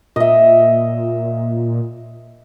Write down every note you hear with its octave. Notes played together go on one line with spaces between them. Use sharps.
A#2 D#5 E5